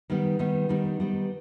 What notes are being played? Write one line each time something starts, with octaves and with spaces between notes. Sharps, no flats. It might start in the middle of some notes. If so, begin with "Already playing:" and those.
D#3 G3 B3 D#4
D#3 G3 B3 D#4
D#3 G3 B3 D#4
D#3 G3 B3 D#4